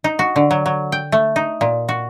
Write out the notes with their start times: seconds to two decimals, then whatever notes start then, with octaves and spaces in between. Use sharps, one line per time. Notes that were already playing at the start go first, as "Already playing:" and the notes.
0.04 D#4
0.19 F#4
0.36 D3
0.51 F#3
0.66 F#3
0.92 G5
1.12 A3
1.36 D#4
1.61 A#2
1.89 F#4